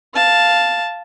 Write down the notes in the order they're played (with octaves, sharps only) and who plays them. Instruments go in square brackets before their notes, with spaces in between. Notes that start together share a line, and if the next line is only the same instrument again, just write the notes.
[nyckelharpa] F5 A5